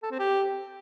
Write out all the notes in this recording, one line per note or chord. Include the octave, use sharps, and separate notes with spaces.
A4
C4
G4